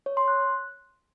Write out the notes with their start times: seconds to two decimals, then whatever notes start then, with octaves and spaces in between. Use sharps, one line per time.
0.06 C#5
0.17 C6
0.28 F#6